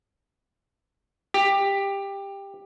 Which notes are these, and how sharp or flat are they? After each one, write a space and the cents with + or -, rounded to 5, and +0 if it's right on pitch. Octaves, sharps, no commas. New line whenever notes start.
G4 +15